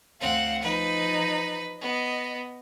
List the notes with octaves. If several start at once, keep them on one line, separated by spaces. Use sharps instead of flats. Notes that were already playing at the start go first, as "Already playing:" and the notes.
D2 C4 F5 F#5
F3 D#4 B4
B3 D#5